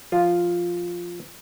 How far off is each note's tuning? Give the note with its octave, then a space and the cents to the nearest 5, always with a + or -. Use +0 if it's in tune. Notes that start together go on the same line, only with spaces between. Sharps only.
F3 +0 F4 +0